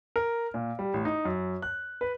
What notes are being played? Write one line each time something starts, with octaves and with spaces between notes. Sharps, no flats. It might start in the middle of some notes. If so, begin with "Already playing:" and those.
A#4
A#2
G3
A1
D#4
F#2
F#6
B4